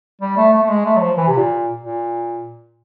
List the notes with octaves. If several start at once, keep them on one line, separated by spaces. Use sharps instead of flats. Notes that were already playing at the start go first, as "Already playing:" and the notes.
G3
A3
A3
A3
G#3
A3
F#3
F3
E3
C3
A#2
A#2